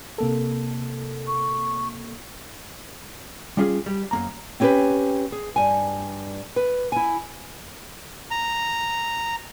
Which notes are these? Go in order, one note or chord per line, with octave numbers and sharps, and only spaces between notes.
C3 A#3 A4
C#6
G3 C#4 F4 G#4
G3
F#2 A#3 A#5
C4 C#4 G4 A4 B4
G#4
G2 G#5
B4
E4 G#5
A#5